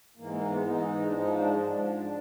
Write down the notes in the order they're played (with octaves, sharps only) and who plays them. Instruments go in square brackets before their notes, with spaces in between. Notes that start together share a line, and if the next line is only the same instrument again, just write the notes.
[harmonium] G#2 E3 G#3 A#3
A#3
B3
G#2 E3 G#3 D#4
D4
G#2 F3 G#3 D#4
D4
G#2 F3 G#3 D4